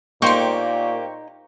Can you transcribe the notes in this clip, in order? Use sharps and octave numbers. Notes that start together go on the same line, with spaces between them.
A#2 A#3 D#4 G4 C5 G5 C#6